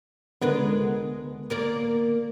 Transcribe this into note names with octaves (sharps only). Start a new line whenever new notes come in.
C#2 D3 G#3 B3 A#4 B4
A#3 A#4 D5